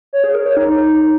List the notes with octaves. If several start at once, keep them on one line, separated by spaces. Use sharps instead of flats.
C#5
G#4
A#4
C#5
D#4